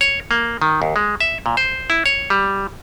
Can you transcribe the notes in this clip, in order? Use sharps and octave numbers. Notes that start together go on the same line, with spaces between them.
C#5
A#3
D#3
D#2
G#3
E5
A#2
C5
E4
C#5
G3